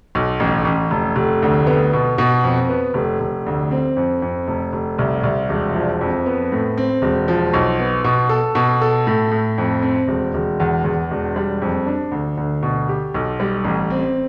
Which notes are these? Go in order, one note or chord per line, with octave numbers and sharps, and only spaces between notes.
B1
A1
A1
F1
F1
D2
B3
B2
B2
F2
B3
F1
F1
D2
C4
F2
F2
F1
F1
C2
C2
E1
F3
F2
B3
A2
C4
E1
F3
B1
B3
B2
A4
B2
A4
A2
A2
F2
C4
E1
E1
E2
E2
E1
G3
F2
D4
D2
D2
B2
G4
B1
G3
A1
C4